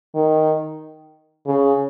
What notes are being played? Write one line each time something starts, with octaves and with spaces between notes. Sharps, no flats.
D#3
C#3